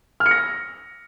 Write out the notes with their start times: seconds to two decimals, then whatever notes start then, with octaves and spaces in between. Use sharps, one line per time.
0.20 F6
0.26 C#7
0.31 A#6